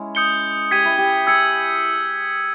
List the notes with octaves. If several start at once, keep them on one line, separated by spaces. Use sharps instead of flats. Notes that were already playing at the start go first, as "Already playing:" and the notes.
Already playing: G#3 C#4 E4
D#6 G6 C#7 G7
G4 G#6 B6 D#7
E4
G4
G#4 E6 G#6 C#7